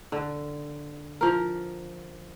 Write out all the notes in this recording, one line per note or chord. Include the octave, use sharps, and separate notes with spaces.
D3
F3 A#4